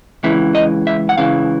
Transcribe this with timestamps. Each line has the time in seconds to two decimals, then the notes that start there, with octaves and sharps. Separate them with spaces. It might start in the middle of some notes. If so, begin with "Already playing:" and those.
0.23 C#2 C#3 E3 E5
0.55 D#5
0.87 E5
1.09 F#5
1.18 C#2 C#3 E3 F5